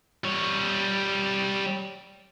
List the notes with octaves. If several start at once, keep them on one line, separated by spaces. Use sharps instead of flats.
G3 C#5